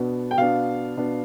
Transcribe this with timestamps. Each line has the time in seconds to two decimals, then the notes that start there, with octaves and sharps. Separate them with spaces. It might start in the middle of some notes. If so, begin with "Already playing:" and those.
Already playing: B2 B3 D4
0.31 G5
0.37 B2 B3 D4 F5
0.97 B2 B3 D4